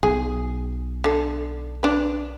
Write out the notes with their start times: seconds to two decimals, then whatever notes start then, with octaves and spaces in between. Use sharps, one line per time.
0.03 B1 G#4
1.04 D3 A4
1.83 D4 B4